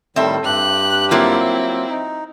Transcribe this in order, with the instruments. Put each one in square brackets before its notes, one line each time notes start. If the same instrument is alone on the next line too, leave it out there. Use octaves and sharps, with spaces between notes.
[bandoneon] A2 D#3 G3 [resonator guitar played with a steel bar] C4 E5 [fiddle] A4
[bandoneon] G2 G4 [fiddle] F#6
[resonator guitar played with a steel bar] F#3 A#3 F4 [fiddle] C4 E4
[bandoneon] D#4